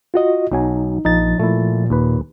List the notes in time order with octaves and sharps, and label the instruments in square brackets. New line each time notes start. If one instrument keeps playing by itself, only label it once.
[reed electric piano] F4 F#4 D#5
[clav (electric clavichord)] B1 F#3 G#5 [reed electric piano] D#4
[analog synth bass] A#1 [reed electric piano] F3 A6 [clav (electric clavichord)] D#4
[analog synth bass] A#2 [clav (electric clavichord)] A3 E4
[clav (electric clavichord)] D#2 B4